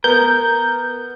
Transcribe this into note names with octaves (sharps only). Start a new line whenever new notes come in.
B3 A#4 G6